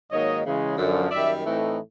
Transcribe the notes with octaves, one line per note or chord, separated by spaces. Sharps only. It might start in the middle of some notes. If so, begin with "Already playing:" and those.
G#2 D#3 F#3 A#3 C#5 D#5
C#3 E3 G#3
F#2 D3 F3
F#2 D#3 G3 D5 E5
A2 E3 A3 C4 D#4